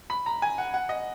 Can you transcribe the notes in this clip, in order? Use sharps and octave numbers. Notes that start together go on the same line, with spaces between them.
B5
A#5
G#5
F#5
F#5
D#5